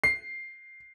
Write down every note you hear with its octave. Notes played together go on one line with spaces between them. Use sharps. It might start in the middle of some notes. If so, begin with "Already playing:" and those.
C7